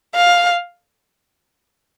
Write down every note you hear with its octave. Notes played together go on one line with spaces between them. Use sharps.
F5